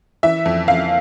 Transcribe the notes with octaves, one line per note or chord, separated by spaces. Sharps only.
E3 E5
F2
F2 F5